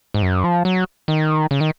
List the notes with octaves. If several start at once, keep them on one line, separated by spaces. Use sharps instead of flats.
G#2
F#2
F3
F#3
D#3
C#3
D#3